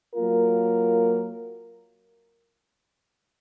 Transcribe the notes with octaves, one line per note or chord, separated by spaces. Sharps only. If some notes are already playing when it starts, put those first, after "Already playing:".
F#3 A#3 F4 A#4